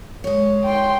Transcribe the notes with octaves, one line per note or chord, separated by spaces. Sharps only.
G#3 C#5
G5 C6